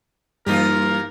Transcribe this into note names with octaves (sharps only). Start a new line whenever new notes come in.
G2 E3 G3 A#3 D#4 F4 G4 A#4